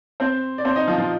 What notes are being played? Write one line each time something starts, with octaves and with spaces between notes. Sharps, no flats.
C4 C5
D5
C4 C5
D#4 D#5
F3 F4
F3 F4